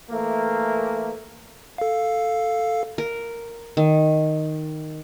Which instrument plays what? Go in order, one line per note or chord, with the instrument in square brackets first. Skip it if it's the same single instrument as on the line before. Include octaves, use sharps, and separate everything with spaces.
[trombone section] E3 A3 A#3
[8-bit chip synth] A4 F5
[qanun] A#4
D#3